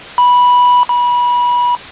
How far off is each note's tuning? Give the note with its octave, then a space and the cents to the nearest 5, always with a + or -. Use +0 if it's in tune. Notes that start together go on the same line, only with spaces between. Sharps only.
B5 -10
B5 -25